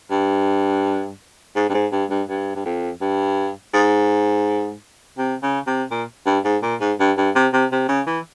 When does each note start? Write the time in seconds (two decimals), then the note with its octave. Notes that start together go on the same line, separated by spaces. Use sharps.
0.11 G2
1.56 G#2
1.69 G2
1.74 G#2
1.92 G2
2.10 G2
2.29 G2
2.55 G2
2.65 F2
3.01 G2
3.74 G#2
5.18 C3
5.42 C#3
5.67 C3
5.91 A#2
6.26 G2
6.44 G#2
6.62 A#2
6.80 G#2
6.99 G2
7.17 G2
7.35 C3
7.53 C3
7.72 C3
7.89 C#3
8.07 E3